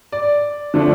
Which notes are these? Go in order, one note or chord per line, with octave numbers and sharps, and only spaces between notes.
D5
D3 F3 A3 D4